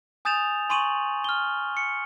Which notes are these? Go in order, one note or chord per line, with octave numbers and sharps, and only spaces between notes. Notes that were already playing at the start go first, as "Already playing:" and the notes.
G#5 D#6 G6 A6 E7 F7
G#5 C6 C#6 D#7 F#7
F6 G7
C#7